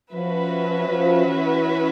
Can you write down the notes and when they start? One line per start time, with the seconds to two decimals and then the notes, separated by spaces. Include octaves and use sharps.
0.13 F3 C#4 F#4 B4 E5
0.88 F3
1.26 E3